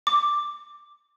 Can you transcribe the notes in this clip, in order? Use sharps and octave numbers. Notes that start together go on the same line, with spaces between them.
D6